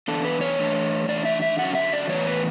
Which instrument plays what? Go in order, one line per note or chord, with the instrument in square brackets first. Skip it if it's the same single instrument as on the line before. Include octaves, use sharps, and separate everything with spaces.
[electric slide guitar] E3 B3 D4 A4
B4
C#5
E3 A3 D4
E3 A3 D4 D5
E5
E5
D3 F#3 C#4 F#5
E5
D5
A2 E3 B3 C#5
B4